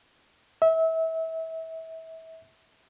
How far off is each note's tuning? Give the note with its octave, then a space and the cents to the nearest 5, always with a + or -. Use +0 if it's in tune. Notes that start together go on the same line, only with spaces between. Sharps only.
E5 -30